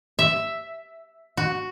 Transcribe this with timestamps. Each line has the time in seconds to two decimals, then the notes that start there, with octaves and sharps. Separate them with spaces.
0.19 E5
1.37 F#4